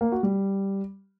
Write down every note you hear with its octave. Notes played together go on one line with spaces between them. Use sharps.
A#3
F#4
G3